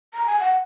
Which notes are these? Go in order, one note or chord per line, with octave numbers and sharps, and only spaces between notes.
A#5
G#5
F#5